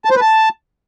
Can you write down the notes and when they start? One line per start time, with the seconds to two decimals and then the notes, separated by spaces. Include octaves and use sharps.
0.05 A5
0.10 C5
0.16 B4
0.21 A5